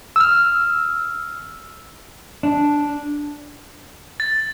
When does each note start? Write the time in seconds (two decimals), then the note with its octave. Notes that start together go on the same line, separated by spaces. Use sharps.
0.16 E6 F6
2.43 D4
4.20 A6